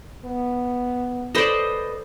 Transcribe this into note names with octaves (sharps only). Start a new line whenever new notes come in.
B3
A4 B4 C5 D5 D#5